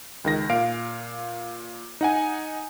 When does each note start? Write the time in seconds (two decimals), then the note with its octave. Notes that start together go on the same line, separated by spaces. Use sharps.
0.24 C#2 D#3 A#6
0.50 A#2 F5 D7
2.01 D#4 F#5 G#5